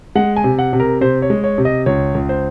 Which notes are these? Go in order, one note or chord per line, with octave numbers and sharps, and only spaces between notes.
G#3 F#5
G#5
C3
F#5
C3
A#4
C3 C5
C#5
G#3
C#5
C3
D#5
C#2 C#5
C#2
C5